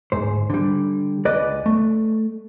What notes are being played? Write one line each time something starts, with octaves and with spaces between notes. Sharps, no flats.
D2 G#2 C5
D3 G3
C#2 B4 D5 D#5
A3